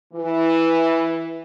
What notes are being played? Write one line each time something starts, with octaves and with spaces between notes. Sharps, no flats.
E3